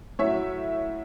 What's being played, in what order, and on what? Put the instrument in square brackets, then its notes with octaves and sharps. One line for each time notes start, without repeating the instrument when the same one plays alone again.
[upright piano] A2 F#3 C#5 E5